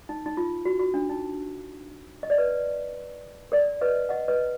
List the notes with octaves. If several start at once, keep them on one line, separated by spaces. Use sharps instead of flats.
D#4
D#4
F4
F#4
F#4
D4
D#4
D#5
D5
B4
A#4 D5
B4 D#5
D#5 F#5
B4 D#5